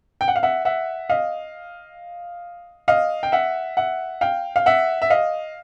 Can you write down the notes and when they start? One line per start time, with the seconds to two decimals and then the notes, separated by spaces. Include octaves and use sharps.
0.21 G5
0.28 F#5
0.36 F5
0.43 E5 F#5
0.65 E5 F#5
1.10 D#5 F5
2.88 D#5 F5
3.23 G5
3.32 E5 F#5
3.77 E5 F#5
4.21 F5 G5
4.56 F5
4.66 E5 F#5
5.02 E5
5.10 D#5 F5